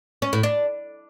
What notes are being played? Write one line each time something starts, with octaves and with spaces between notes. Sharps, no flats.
C#4
A2
D4